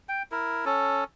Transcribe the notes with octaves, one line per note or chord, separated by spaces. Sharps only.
G5
E4 A#4
C#4 A4